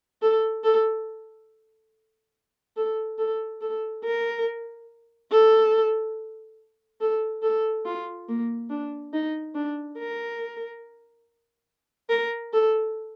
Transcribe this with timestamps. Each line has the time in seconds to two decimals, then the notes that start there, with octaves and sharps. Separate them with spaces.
0.22 A4
0.64 A4
2.77 A4
3.18 A4
3.61 A4
4.04 A#4
5.31 A4
7.01 A4
7.43 A4
7.86 F4
8.29 A#3
8.70 D4
9.13 D#4
9.55 D4
9.98 A#4
12.10 A#4
12.53 A4